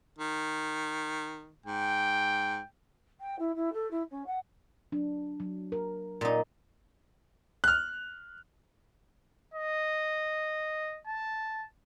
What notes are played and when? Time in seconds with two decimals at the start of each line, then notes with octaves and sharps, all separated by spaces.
0.19 D#3
1.66 G#2 G5
3.20 G5
3.38 E4
3.55 E4
3.72 A4
3.90 E4
4.10 C#4
4.26 F#5
4.92 F#3 D4
5.40 F#3
5.72 A#4
6.21 A#2 D#4
7.64 F6 F#6
9.54 D#5
11.07 A5